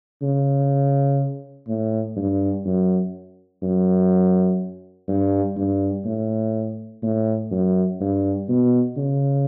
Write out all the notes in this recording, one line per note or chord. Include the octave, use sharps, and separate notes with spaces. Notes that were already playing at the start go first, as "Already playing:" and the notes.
C#3
A2
G2
F#2
F#2
G2
G2
A2
A2
F#2
G2
B2
C#3